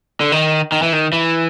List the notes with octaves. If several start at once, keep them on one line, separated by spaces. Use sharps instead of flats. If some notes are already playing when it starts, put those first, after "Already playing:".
D3
D#3
D#3
E3
D#3
E3